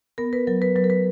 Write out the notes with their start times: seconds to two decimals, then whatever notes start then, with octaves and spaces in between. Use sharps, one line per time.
0.18 B3 A#4
0.33 B4
0.47 F#3 A#4
0.62 B4
0.76 F#3 B4
0.84 A#4
0.90 B4